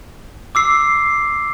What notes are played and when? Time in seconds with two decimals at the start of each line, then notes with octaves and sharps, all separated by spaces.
0.55 D6 E6 C7